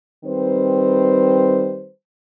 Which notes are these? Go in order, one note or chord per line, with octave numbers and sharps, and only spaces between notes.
D#3 G3 C4 B4 C5